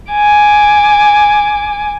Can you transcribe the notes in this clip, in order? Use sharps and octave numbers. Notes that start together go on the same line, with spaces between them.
G#5 D6